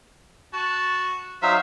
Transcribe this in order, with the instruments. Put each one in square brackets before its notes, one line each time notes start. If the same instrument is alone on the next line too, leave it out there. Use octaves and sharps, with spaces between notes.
[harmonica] F#4 A5
[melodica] F#3 D#4 F5 [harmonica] C5 E5